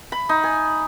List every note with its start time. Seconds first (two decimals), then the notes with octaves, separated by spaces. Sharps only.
0.12 B5
0.29 D#4
0.44 G#5